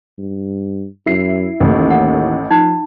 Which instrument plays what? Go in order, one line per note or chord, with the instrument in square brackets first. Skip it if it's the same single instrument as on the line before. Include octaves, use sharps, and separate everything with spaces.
[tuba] G2
[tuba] F#2 [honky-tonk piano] E4 C7
[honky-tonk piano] A1 A2 [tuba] D#2
[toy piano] F#5
[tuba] F3 [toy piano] D#4